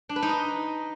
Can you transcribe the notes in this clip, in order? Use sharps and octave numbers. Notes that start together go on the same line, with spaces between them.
D4
B4
D#4
D#5